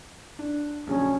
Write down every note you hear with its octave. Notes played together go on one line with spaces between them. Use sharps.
D4
A#1 C#3 F#3 C#4